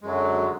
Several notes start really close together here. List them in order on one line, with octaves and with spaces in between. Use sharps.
G#3 F#2 F#3 D3